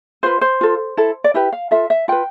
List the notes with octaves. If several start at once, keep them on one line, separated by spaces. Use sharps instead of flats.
F4 B4 C5
C5
F4 A4
E4 A4
D5
E4 G4 B4 E5
F5
F4 A4 E5
E5
F4 B4 G5